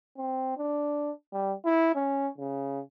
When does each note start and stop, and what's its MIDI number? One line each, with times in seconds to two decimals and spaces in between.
0.17 0.55 60
0.57 1.11 62
1.33 1.53 55
1.65 1.95 64
1.95 2.28 61
2.38 2.80 49